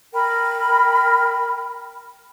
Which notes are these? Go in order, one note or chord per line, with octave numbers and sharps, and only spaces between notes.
A#4 G5 B5